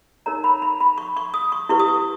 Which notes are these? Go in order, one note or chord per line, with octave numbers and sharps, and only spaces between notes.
D#4 A#4 C#5 A#5
B5
B5
B5
C#6
C#6
D#6
C#6
E4 G4 B4 C#6
D#6
C#6